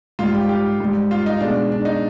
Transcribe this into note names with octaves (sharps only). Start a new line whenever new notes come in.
G#2 G3 F4
G4
G4
G#2 G3
F4
D#4
B2 G#3 D4
D4
D#4